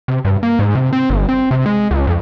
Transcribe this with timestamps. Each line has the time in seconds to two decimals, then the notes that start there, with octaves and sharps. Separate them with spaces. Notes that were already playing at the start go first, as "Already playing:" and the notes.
0.08 C3
0.25 G2
0.43 A#3
0.59 G#2
0.75 C3
0.93 C4
1.10 G1
1.29 C4
1.51 C3
1.66 G#3
1.91 C#2
2.07 F2